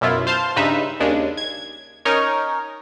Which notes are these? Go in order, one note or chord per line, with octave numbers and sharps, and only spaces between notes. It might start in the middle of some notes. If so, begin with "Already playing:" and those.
F#2 B2 E4 F4
C5 F5 A5 C6
G2 C#3 D#4 B4 E5
D#2 C#3 G#3 D4
G#6
C#4 D#4 A#4 C#5